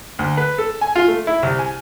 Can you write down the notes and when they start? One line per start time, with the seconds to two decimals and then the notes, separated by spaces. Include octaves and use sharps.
0.19 D2
0.37 B4
0.58 A4
0.81 G#5
0.96 F4
1.08 A3
1.27 E4
1.43 C2
1.59 G#5